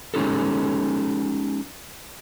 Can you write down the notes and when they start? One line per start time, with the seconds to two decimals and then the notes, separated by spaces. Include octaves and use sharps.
0.14 G#3 C#4 D#4 G4 A4